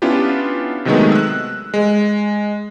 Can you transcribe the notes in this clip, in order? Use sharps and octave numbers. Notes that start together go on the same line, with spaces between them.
B3 C#4 D4 E4 F4 G4
C3 D#3 F#3 G#3 A3 B3
E6 F#6
G#3